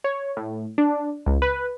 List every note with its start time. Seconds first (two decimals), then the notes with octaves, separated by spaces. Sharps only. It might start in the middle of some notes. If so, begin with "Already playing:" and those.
0.04 C#5
0.37 A2
0.78 D4
1.26 C#2
1.42 B4